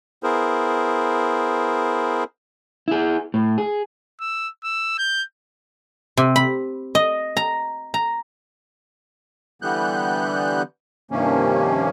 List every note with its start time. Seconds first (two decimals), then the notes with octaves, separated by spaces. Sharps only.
0.23 B3 E4 G#4 A#4 C5
2.88 E4 G#4
3.34 A2
3.58 G#4
4.21 E6
4.64 E6
4.98 G6
6.17 C3
6.36 B5
6.95 D#5
7.37 A#5
7.94 A#5
9.62 D3 E3 G3 B3 F#6 G6
11.11 G2 C3 D#3 F3 A#3 C#4